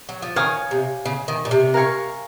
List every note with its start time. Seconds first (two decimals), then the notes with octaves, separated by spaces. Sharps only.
0.09 F#3
0.22 F3
0.36 D#3 C#5 F5 G#5 D#6
0.71 C3
1.05 C#3
1.28 D#3
1.45 A#2
1.51 C3
1.74 A#4 F5 G#5 C#6